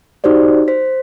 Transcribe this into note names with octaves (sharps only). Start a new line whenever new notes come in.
D#4 F#4 G4 C5 D5
C5 B6